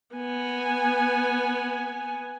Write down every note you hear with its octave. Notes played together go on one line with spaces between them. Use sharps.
B3 G#5